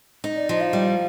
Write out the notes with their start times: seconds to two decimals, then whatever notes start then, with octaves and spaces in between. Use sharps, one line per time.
0.24 D#4
0.36 D5
0.49 F3 D#5
0.61 F5
0.73 G3